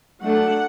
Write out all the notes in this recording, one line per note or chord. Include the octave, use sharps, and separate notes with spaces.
F#3 A3 D4 F#5